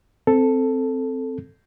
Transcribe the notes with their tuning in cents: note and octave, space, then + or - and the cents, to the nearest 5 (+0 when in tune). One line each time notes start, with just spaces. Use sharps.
C4 -5 A4 +0